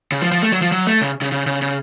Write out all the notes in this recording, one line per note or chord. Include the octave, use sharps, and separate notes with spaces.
C#3
F3
F3
A3
F#3
F3
F#3
A3
C#3
C#3
C#3
C#3
C#3